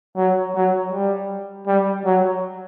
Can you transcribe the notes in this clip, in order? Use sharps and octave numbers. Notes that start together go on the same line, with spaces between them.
F#3
F#3
G3
G3
F#3